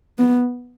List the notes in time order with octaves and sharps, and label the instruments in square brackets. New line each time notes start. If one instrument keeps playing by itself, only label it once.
[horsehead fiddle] B3